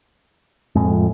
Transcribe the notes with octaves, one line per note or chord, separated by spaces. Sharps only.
F2 A2 G#3